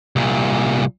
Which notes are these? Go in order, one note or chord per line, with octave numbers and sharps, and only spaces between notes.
C2 A#2